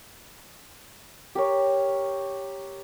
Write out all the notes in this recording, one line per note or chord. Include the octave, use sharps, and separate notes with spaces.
G4 A#4 C#5